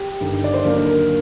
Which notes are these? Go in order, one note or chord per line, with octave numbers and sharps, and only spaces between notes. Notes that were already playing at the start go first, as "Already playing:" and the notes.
Already playing: G4
G1 G2 D#3
D5
C5
D#2 D3 F#3 A#4
A#4